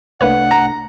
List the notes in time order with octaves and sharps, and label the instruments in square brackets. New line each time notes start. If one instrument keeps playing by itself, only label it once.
[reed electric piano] C2 A3 D4 [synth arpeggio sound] A#3 B4 C#5 [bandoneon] F#5
[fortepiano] A#5